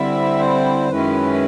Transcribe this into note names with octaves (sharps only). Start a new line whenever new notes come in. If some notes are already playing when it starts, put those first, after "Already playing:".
Already playing: D3 G3 C4 E4 E5
C5
F#2 D#3 G#3 C#4 E4 B4